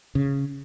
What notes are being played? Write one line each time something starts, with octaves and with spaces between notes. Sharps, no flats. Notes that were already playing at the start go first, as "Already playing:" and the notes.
C#3